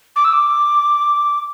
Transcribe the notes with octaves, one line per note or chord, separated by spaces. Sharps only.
D6
E6
D6